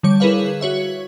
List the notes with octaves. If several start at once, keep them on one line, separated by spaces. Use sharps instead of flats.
D3 G3 C#5 D6
E4 G#4 A#4 B4 C#5 F5
F#4 C#5 E5